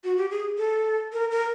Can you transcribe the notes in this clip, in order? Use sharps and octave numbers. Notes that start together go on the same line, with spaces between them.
F#4
G4
G#4
A4
A#4
A#4